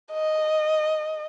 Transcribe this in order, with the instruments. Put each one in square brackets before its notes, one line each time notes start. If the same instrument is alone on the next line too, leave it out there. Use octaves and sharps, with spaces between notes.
[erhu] D#5